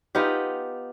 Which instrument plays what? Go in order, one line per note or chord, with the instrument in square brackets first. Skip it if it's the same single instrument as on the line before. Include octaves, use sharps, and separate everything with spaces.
[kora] B3 D#4 F4 G4